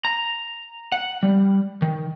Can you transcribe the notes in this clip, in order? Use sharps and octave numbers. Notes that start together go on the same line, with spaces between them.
A#5
F#5
G3
D#3